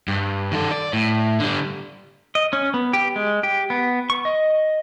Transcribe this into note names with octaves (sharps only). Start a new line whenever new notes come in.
G2
D#3 A4
D5
A2
D3 G3
D#5
C#4
B3
G4
G#3
G4
B3
C#6
D#5